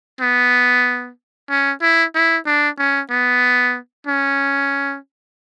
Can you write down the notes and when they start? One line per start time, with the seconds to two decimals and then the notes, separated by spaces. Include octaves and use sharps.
0.21 B3
1.50 C#4
1.82 E4
2.15 E4
2.46 D4
2.78 C#4
3.10 B3
4.07 C#4